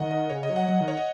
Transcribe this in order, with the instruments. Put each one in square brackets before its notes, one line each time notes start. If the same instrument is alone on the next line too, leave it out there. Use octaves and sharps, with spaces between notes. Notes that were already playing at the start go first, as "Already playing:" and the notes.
Already playing: [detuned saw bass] D#3 [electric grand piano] D#5 F#5
[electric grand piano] D#5
[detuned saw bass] C#3 [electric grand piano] C#5
[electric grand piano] D#5
[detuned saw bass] F#3
[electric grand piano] F#5
[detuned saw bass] F#3 [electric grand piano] D#5
[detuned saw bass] D#3
[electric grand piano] C#5
D#5